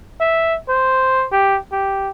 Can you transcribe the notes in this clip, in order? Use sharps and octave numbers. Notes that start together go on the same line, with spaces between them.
E5
C5
G4
G4